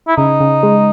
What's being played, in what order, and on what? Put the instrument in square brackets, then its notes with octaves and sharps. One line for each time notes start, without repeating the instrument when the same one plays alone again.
[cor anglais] E4
[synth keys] C#3 [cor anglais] D#4
[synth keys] C#3
G#3